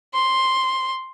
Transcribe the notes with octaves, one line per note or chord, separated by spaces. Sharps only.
C6